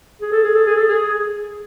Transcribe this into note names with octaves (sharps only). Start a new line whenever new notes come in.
G#4
A4
G#4
A4
G#4
A4
G#4